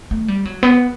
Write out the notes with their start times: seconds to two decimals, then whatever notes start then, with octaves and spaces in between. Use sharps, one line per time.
0.11 A3
0.28 G3
0.45 F#3
0.63 B3